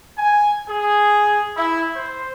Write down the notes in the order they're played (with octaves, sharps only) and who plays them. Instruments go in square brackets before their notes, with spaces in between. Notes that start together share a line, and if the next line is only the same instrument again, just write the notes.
[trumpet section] G#5
G#4
E4
C5